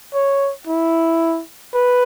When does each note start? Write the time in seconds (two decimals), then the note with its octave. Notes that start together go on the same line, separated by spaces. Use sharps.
0.15 C#5
0.67 E4
1.74 B4